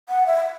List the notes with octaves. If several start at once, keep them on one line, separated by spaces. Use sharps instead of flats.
F#5
E5